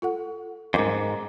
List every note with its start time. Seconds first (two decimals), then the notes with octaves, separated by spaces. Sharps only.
0.02 F4 A4 F#5
0.74 F2 G#2 C#4 A#4 D6